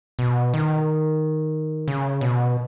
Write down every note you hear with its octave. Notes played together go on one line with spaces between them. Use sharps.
B2
D#3
C#3
B2